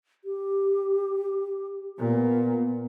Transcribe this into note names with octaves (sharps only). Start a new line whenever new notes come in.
G4
A#2 B3